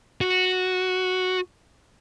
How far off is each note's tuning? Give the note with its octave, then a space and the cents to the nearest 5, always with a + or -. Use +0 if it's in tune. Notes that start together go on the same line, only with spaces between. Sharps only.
F#4 -5